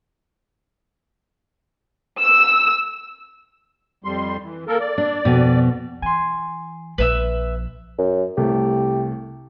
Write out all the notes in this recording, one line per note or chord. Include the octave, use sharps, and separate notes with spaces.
E6
F2 G3 C6
E3
A#3 A4 A#4
D5
D4
F2 B2
E3 G#5 C6
A#1 F3 B4 E5 E6
F#2
C2 A3 G4